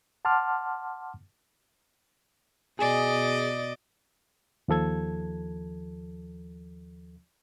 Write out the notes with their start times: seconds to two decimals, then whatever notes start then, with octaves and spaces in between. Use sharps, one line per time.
0.25 F#5 A5 C6 D6 F6
2.79 B2 G#4 D5 D#5
4.68 D#2 F3 A4 G#6